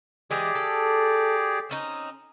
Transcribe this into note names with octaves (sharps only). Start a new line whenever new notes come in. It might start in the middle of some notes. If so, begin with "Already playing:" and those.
E3 G#3 G4 G#4 D5
A4
C4 C#4 D#4